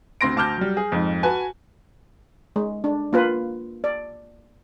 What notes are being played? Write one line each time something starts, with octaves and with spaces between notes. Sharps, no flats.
D2 C4 C6 A#6 D7
D2 A5 D6 F6 G6
F#3 G3
G#4
F2 G#2
F#4 B4 G#5 A5
G#3
D4
A#3 F4 B4
D5